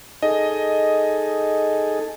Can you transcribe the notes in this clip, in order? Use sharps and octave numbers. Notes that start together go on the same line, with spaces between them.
D#4 G#4 A4 D#5